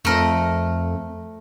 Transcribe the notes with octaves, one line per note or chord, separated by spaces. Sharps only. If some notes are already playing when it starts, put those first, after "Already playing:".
F2 A3 A#4